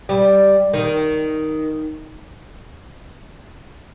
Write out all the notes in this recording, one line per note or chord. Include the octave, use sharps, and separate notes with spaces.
G3
D#3